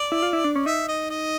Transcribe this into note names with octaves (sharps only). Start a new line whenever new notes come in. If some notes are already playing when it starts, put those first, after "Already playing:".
Already playing: D5
E4
F4
E4
D4
C#4
D#4 E5
D#5
D#5